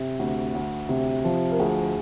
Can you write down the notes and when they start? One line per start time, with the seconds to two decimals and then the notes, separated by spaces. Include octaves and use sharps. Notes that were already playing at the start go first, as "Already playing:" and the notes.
Already playing: C3
0.19 D2
0.55 D2
0.89 C3
1.25 F3
1.52 A#4
1.59 D2 G#4